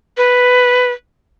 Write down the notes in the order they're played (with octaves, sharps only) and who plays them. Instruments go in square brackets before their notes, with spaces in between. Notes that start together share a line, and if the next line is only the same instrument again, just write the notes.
[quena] B4